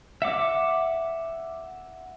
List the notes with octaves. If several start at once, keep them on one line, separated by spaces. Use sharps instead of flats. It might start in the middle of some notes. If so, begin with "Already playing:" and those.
E5 F#5 D6